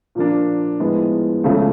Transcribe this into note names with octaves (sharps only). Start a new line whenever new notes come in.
A#2 F3 A#3 D4
A2 F3 G#3 B3
C#2 C#3 F3 A3